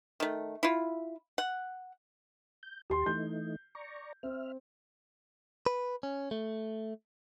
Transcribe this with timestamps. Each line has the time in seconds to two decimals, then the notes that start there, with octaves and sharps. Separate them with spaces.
0.20 D#3 A3
0.63 E4 F4
1.38 F#5
2.63 G6
2.90 D#2 G4 A5 C6
3.06 E3 A3 D#4 G6
3.75 D5 A#5 C#6
4.23 C4 E5 F6
5.66 B4
6.03 C#4
6.31 A3